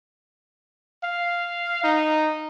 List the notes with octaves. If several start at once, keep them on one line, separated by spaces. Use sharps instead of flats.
F5
D#4